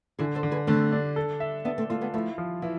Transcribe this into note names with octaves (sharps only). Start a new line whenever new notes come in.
D3 E4 G#4
A4 C5
D3
G#4 B4
D3 A3 C4
D4
A4
E5
B3 D4 E5
A3 C4
A3 C4 F4
G#3 B3
F3 A3 E4
F3
E3 E4